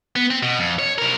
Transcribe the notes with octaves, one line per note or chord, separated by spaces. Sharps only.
B3
C4
B2
F2
C#5
C3 A#4